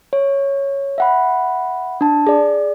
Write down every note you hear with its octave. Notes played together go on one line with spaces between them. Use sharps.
C#5
E5 F#5 B5
D4 A5
G#4 D5